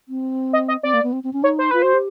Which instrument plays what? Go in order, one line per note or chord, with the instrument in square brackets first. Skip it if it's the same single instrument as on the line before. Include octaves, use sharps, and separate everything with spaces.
[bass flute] C4
[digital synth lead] D#5
D#5
[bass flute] C4 [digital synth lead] D5
[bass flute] A#3
B3
C4
C4
C#4
[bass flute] D#4 [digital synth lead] C#5
[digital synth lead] C5
[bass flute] F4 [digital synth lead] B4
[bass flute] F#4 [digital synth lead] C5
[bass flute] G4